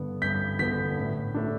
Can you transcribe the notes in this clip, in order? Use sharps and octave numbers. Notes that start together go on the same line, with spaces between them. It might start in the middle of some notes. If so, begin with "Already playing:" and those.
Already playing: G2 D3 B3
G2 G6 B6
D3 B3 G6 B6
A2
A3 D4